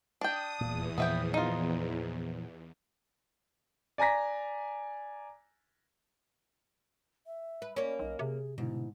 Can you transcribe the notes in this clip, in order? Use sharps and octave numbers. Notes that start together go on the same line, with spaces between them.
D4 G5 D#6
D#1 E2 A#2
A#2 E3 F3 B3 E5 G5
D#4 F4
D5 G#5 A#5 A#6 B6
E5
B4
A#3 C#4 D5
B1 D#5
C3 G#4
G#2 B2 D3 E4